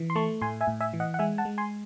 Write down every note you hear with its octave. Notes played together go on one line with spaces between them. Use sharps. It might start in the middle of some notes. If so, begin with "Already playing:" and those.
Already playing: E3
C6
A3 A5 C#6
A2 G#5 C6
E5 G#5
A2
E5 G#5
E3
D#5 F#5
F#5
G#3 E5 G#5
F#5 A5
G#3
G#5 C6